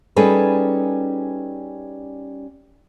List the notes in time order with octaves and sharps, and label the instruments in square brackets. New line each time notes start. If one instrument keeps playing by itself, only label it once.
[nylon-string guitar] G3 C#4 D#4 G#4 A4 B4